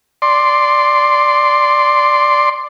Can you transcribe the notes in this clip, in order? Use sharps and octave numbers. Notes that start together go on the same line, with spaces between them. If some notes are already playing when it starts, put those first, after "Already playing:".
D5 C6